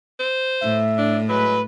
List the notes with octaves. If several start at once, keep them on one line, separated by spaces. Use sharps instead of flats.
C5
A2 E5
D4
F#3 G#3 B4